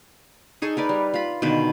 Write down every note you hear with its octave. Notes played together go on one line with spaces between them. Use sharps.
D#4 G#4 A4 C#6
A#4 B4 D5
G3
F4 B5
B2 D3 D#3 B4